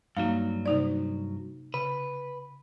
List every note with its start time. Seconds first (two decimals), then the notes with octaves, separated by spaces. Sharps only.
0.17 G2 F#3 A#3 D#4 F5
0.66 C3 D#4 D5
1.74 C#3 B4